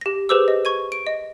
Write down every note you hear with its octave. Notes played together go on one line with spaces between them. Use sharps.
G4 A#6
G4 G#4 B4 C5 D6 E6
D#5
C#6 G#6 D#7
D7
D#5